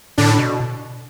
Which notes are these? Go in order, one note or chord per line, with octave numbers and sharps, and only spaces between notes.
A2 D3 D4
B2